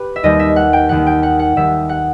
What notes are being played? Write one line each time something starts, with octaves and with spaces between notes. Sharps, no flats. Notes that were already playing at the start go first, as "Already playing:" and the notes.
Already playing: G4 B4
E5
D#2 D#3 G3 D#5
E5
F#5
G5
D#2 D#3 G3 F#5
G5
F#5
F#5
D#2 D#3 G3 E5
F#5